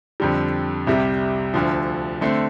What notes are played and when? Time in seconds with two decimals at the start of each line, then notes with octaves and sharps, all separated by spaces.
0.20 F2 D3 G3
0.87 C2 C3 G3
1.54 D2 D3 F3
2.21 D3 A3 C4